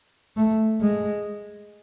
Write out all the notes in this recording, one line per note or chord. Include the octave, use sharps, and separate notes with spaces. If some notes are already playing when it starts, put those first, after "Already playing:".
A3
G#3